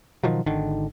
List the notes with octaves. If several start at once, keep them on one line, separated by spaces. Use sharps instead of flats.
B2 D#3 F3 F#3
G#1 D3 D#3